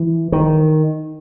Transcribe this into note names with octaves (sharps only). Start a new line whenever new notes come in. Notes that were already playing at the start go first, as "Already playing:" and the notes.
Already playing: E3
D#3